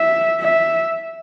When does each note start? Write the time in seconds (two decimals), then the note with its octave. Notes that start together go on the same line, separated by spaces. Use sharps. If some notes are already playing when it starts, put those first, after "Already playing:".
Already playing: E5
0.40 E5